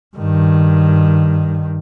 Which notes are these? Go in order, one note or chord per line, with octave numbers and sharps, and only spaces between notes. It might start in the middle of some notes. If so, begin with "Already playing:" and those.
G2 D#3